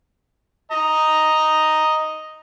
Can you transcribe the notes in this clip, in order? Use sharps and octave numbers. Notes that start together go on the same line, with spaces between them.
D#5 A#5